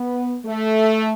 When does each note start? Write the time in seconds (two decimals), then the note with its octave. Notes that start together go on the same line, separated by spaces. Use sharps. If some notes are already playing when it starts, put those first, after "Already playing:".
Already playing: B3
0.46 A3